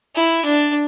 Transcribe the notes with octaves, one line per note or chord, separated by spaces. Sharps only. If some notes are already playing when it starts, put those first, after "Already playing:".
E4
D4